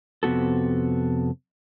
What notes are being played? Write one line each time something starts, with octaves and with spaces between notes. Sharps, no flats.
F2 C3 B3 F#4 A4